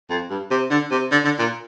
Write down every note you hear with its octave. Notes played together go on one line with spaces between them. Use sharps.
F2
G2
C3
D3
C3
D3
D3
A#2